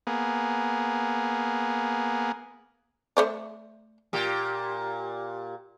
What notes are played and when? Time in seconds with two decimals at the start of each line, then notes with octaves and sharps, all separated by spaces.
0.07 A#3 B3 G#4
3.17 A3 C5 D5
4.13 A#2 G4